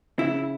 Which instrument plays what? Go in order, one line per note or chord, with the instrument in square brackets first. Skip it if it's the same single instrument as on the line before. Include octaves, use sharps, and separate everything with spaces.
[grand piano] C#3 [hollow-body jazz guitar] E4